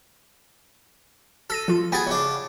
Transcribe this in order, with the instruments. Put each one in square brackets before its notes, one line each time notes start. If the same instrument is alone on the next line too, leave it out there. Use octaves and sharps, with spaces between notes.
[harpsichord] A4 [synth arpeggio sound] E6 A#6 D#7
[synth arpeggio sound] F3 F4
[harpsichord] B3 G#4 [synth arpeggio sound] G5 A6
[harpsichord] C#3 D4